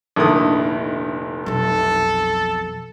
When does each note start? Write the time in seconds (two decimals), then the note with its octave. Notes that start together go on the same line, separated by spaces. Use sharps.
0.16 F1 A#1 D3 D#3 E4 D#6
1.46 B1 F2 A4